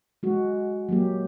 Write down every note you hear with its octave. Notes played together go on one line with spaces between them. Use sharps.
G#3 F#4
F#3 A#3 G4